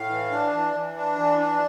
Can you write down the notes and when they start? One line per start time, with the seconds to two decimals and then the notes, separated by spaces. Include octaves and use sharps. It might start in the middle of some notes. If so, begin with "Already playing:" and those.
Already playing: A2 F5
0.09 E3
0.31 D4
0.52 E3
0.74 E3
0.96 D4
1.18 E3
1.39 D4